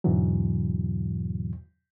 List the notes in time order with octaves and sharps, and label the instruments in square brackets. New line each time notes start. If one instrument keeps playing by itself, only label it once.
[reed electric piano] E2 G#2 B2 D3 E3 F#3